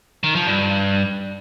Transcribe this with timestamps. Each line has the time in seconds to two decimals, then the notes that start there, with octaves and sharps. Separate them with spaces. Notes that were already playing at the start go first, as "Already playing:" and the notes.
0.24 D#3
0.35 F3
0.47 G2